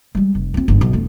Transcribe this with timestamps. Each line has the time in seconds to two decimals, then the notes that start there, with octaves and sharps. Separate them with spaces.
0.15 G3 G#3
0.35 F1
0.54 C4 F4
0.68 G1 G#2
0.81 B1
0.93 E1 A3